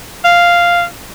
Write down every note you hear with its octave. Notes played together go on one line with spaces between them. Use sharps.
F5